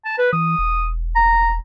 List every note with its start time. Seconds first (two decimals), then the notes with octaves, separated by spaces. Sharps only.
0.05 A5
0.18 B4
0.33 E3 D#6
0.59 E1
1.16 A#5